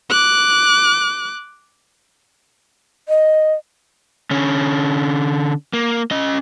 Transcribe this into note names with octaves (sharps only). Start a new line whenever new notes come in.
D6 F#6
D#5
D3 C#4
A#3
C#4 D#5